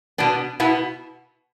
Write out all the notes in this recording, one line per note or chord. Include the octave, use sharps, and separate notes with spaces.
B2 B3 D4
B2 B3 E4